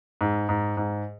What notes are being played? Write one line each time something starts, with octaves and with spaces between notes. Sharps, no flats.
G#2
G#2
G#2